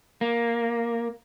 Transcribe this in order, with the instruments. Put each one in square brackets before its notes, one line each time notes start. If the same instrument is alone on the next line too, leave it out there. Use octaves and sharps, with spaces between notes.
[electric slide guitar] A#3